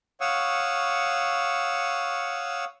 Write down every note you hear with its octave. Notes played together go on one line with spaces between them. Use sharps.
C#5 F5 F#5 C#6 D#6 E6